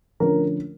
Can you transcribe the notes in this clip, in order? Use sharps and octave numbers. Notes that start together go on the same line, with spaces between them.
D3 F3 A3 C#4 A#4